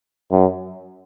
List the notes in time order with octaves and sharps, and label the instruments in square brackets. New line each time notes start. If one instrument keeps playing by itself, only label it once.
[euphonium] F#2